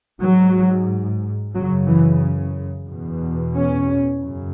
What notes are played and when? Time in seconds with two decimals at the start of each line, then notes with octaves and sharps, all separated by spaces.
0.22 G#2 F#3
1.54 F#2 C#3 F#3
1.88 E3
2.88 E2 B2
3.54 C#4
4.21 F#2 C#3